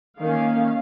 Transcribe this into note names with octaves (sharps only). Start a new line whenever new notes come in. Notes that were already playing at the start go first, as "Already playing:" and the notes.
D#3 A#3 C#4 F5